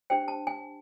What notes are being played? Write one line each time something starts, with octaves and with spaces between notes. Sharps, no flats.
D4 G4 C5 G5
A5
G#5